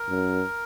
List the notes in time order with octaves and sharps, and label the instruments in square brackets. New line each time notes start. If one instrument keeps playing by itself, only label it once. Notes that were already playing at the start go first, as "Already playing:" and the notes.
Already playing: [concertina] A#4
[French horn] F#2